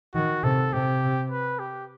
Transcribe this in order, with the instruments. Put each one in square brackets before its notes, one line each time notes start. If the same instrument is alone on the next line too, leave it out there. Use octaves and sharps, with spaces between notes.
[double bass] D#3 [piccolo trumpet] F#4
[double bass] C3 [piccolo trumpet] A4
[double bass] C3 [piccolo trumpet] G4
[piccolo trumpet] B4
G4